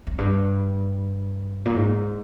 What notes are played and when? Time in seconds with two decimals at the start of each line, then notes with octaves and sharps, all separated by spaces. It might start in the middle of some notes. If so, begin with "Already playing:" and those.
0.07 F2
0.18 G2
1.66 A#2
1.76 G#2